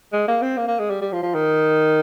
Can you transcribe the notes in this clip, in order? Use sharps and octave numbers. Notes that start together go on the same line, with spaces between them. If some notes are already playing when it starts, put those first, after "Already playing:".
G#3
A#3
C4
A#3
A#3
G#3
G3
G3
F3
F3
D#3